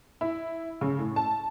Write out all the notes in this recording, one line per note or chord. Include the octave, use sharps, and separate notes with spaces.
E4
C#3
A2
A5